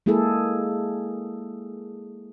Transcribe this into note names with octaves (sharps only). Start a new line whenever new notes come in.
G#3 A#3 E4 G#4 A4